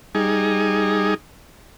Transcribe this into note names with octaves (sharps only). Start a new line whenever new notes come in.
G3 D#4 G#4